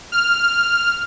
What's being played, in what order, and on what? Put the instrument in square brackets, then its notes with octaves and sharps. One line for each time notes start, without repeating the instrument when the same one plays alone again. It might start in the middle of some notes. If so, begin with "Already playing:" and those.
[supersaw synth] F6